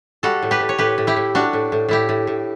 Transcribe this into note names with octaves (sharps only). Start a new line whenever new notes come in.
G3 F#4 A4
A2
G4 B4
A2
C#5
A2 G4 B4
A2
E4 G4
A2
G3 D4 F#4
A2
A2
A2 E4 G4
A2
A2